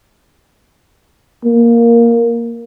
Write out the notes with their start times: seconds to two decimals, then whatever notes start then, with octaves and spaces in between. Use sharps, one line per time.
1.45 A#3